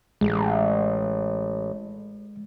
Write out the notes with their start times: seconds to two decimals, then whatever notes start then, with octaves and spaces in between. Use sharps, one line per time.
0.21 A1 G#3